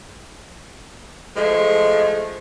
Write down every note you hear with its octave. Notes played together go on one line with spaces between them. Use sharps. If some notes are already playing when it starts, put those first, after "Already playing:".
F3 G#3 A3